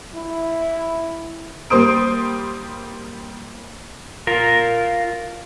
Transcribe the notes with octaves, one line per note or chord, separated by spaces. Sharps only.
E4
G3 A#3 C5 D#6 D7
F4 A#4